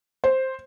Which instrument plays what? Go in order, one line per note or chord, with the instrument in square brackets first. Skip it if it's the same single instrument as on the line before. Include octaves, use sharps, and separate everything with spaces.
[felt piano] C5